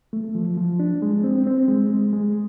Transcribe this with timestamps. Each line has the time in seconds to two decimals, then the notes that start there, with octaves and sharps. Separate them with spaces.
0.13 A3
0.35 F3
0.57 F3
0.80 D4
1.02 G#3
1.24 C4
1.47 C4
1.68 G#3
1.91 G#3
2.13 G#3